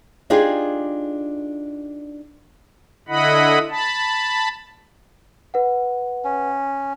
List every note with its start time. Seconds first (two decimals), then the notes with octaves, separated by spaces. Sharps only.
0.30 D4 D#4 F4 G4 G#4 G#5
3.08 D3 E4 D#5 F#5 B5
3.70 A5 B5
5.54 B4 F#5
6.24 C#4